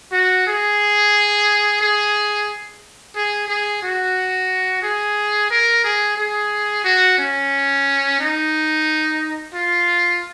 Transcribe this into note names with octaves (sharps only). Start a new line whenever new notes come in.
F#4
G#4
G#4
G#4
G#4
F#4
G#4
A#4
G#4
G#4
F#4
C#4
D#4
F4